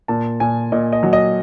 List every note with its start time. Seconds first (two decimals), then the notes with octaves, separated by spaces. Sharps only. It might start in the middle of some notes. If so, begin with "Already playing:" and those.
0.08 A#2 A5
0.40 A#2 G#5
0.72 A#2 D#5
0.93 D#5
1.03 F#3
1.13 D#5